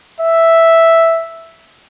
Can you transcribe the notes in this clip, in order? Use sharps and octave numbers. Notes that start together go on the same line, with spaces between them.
E5